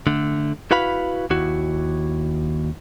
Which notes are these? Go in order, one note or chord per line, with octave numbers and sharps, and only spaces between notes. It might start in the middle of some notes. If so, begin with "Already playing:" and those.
D3 A3
E4 F#4 B4 F5 B5
D#2 E4 F#4